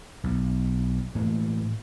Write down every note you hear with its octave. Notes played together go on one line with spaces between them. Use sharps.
B1
A2 E3 A#3